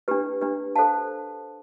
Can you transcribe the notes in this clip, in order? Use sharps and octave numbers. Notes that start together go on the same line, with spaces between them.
D4 G4 B4
D4 G4 B4
A4 C5 F5 A5